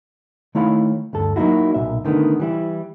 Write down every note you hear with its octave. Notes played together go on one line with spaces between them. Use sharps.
D#3 A3 E4 C#5 F5 B5
D2 G2 A4
F#3 A#3 C#4 D#4 E4 F#4
B1 A#2 E5
D3 D#3 A3 B3
E3 G3 E4